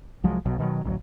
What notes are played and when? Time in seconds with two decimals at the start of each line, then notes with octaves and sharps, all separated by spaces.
0.24 C2 F3 F#3 G#3
0.46 B1 B2 F#3
0.59 B2 D#3 F3 F#3
0.84 A1 D2 F#3